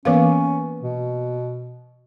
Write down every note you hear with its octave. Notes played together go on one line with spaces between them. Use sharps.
E3 A#3 B3 C#4 B4 F5
B2